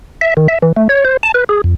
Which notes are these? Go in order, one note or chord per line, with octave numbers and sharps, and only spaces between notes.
E5
D#3
E5
E3
A3
C#5
C5
A5
B4
G#4
F2